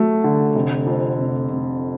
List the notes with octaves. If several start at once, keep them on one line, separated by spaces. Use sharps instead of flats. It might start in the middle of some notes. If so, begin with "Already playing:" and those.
Already playing: F#3 A3
D3
F1
F2
F1
F1